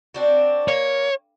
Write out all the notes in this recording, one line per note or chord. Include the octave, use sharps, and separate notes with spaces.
C4 D4 F#4
A#3 C#5